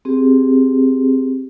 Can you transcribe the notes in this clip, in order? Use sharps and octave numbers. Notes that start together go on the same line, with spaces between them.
C4 G4 G#4